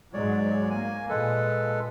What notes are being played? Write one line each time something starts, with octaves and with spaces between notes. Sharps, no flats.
G#2 F#3 G#3 C#5 D5
A#3 G#5
A#2 G#3 A4 B4